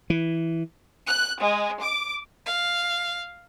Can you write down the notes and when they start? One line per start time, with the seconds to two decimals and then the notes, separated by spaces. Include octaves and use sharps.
0.10 E3
1.08 F#6
1.42 G#3
1.82 D6
2.46 F5